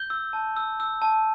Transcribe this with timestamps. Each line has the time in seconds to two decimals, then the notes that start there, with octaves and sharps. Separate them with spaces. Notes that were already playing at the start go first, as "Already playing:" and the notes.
Already playing: G6 G7
0.10 E6
0.33 A5
0.57 E6
0.80 E6
1.02 A5